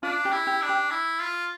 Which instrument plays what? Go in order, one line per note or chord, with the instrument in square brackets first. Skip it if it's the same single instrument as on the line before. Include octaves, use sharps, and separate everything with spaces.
[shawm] D4 [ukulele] F4
[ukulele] G4
[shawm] E4
[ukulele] G4
[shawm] D4
[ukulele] G4
[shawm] E4
F4